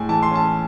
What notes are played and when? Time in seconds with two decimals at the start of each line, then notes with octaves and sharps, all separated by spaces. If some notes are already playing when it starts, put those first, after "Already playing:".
Already playing: A2 G#3 G#5
0.09 E3 A5
0.23 C6
0.31 C#4 A5